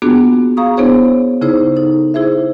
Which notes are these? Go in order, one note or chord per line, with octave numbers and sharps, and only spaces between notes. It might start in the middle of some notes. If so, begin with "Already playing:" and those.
A#3 B3 D4 F4 F#4 G#4
G#4 F5 A#5 C#6 D#6
B3 D4 E4 G#4 C5 C#5
C#3 D#4 E4 G#4 C5
D#4 A4
E4 G#4 C5 E5